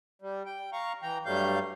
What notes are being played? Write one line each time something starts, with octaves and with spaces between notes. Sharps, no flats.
G3
G5
F5 A#5 C#6
E3 G5 A#5
G2 F#3 G3 A3 F5 G6